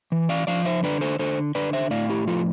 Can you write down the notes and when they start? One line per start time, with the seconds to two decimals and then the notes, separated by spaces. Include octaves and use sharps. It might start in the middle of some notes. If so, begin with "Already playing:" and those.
0.12 E3
0.29 D5 F5
0.47 F3 D5 F5
0.65 C5 E5
0.83 D3 B4 D5
1.01 A4 C5
1.19 D3 A4 C5
1.55 D3 B4 D5
1.73 C5 E5
1.91 A2 D5 F5
2.09 E4 G4
2.27 F3 F4 A4